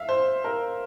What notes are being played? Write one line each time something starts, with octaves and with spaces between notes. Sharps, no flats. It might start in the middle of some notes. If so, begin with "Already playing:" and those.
Already playing: E5 F5
C5
A#4